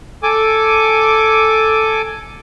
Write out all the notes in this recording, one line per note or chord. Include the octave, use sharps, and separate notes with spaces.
A4 G#5 D6